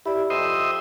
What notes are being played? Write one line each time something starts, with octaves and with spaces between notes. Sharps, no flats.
E4 G4 D5
F2 C5 D#5 E5